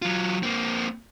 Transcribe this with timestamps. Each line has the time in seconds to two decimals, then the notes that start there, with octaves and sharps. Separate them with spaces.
0.02 F#3 F4
0.43 A#3 C4